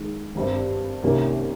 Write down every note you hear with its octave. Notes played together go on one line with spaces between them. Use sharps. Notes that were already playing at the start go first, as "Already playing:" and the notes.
Already playing: D#3 G#3
G#1 G2 G3 C4
C2 C3 D#3 A#3 C#4